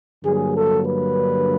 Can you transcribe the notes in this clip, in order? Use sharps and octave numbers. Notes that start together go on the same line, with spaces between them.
G2 D3 F#3 A#3 G#4
A4
B4